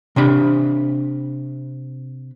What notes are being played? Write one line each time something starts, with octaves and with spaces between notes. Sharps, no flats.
C3 D4 B5